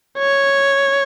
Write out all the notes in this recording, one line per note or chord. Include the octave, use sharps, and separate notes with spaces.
C#5